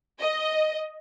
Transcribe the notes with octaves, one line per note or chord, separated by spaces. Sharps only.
D#5